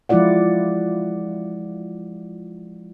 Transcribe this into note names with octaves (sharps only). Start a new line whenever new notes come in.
F3 G#3 E4 F4 D5 F#5